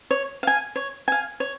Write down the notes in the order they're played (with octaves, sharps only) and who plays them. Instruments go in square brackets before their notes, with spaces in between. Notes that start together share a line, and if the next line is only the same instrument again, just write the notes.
[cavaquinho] C#5
F5 G#5
C#5
F5 G#5
C#5